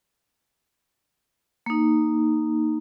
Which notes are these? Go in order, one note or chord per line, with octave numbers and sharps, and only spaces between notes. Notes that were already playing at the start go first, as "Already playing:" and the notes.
A#3 D#4